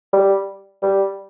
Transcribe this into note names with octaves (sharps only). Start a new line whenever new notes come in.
G3
G3